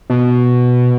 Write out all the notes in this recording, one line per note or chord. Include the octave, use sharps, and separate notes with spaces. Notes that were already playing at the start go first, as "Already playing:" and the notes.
B2